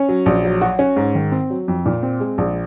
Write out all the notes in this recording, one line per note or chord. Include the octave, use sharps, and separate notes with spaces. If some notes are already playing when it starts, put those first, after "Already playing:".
Already playing: C#4
F#3
A#1
F#3
F#4
C#4
G#2
D#3
C4
F#3
F2
A#2
C4
G#3
A#1